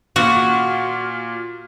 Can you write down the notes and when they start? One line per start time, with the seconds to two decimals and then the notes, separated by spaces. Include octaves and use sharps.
0.16 A#2 F4 F#4 C#7